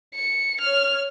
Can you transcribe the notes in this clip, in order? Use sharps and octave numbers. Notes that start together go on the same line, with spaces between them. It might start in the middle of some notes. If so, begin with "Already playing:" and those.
C#7
C#5 F6